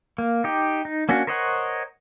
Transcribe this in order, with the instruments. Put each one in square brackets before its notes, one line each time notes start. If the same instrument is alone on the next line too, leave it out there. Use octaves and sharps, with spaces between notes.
[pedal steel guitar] A#3
D#4 G4
D#4
A#3 C#4 D4 F#4
A#4 C5 C#5 D#5 F#5